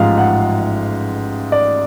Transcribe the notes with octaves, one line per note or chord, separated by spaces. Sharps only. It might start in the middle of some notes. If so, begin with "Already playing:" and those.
Already playing: A1 G#2 F3 G#3 F5 F#5
F#5
D5